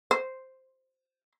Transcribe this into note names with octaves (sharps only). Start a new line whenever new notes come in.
C5